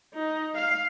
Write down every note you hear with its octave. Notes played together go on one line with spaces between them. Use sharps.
D#4
F5